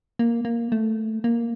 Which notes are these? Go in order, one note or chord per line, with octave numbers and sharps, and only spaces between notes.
A#3
A#3
A3
A#3